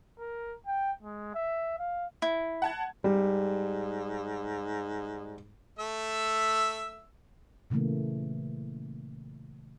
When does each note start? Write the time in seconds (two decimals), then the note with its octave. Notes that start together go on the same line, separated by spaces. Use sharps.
0.19 A#4
0.66 G5
1.03 G#3
1.34 E5
1.79 F5
2.22 E4
2.62 F#5 A5 G#6
3.04 G#2 G3
5.79 A3 E5 E6
7.70 A#2 C#3 E3 A3 A#3